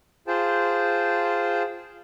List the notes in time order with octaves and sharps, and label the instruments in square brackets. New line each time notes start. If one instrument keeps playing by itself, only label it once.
[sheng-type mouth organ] F4 G#4 C5 G5 A5